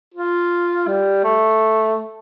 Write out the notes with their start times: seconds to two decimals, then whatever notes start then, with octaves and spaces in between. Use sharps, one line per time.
0.14 F4
0.87 G3
1.24 A3